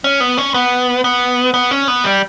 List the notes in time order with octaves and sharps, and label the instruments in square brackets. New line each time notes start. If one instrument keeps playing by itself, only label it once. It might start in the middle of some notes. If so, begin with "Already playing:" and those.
[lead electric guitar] C#4
B3
C#4
B3
B3
B3
C#4
B3
G3